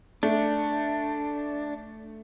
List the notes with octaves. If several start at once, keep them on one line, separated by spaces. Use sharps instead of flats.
A3 D4